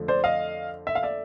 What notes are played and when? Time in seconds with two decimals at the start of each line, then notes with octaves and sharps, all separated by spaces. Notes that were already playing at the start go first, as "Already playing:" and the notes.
Already playing: F2 D3 F3 A3
0.08 C5 D5
0.24 D#5 F5
0.87 E5
0.95 F5
1.03 D5 E5